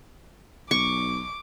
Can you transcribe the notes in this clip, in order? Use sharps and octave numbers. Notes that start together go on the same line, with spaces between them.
B1 C#6 D6